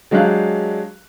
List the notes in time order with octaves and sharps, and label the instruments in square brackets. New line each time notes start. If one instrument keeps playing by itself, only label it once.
[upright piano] F#3 G#3 D4 G4 F5 F#6